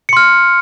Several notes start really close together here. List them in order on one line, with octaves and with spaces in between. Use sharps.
C#7 C6 F6